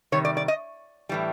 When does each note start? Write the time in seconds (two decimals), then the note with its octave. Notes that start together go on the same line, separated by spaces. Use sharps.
0.12 C3 D#3 G3 C#5
0.25 D5
0.37 D5
0.48 D#5
1.09 A2 E3 G3